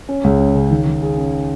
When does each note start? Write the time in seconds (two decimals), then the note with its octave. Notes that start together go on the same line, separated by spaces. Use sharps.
0.09 C#4
0.24 C#2
0.40 C#4
0.55 C#3
0.70 D#3
0.86 D#3
1.02 G#4
1.18 C#4